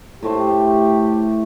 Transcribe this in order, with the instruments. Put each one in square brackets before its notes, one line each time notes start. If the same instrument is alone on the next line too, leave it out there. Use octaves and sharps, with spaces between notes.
[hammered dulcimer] A2 A3 C5 [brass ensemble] G4